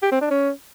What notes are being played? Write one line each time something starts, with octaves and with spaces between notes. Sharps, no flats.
G4
C4
D4
C#4